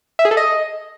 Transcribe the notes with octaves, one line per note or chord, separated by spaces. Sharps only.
E5
G#4
A4
D#5